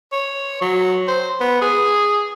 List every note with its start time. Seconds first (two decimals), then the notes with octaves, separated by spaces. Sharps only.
0.12 C#5
0.61 F#3
1.07 C5
1.40 B3
1.61 G#4